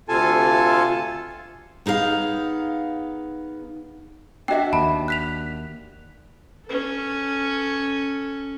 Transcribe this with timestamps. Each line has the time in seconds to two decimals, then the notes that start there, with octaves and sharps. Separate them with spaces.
0.09 D2 C3 F4 A4 G#5 A5
1.86 B3 D#4 G#4 F5
4.48 D4 F#4 D#5 E5 G5
4.73 D#2 A5 B5
5.08 F#6 B6 F7
6.66 C#4 A4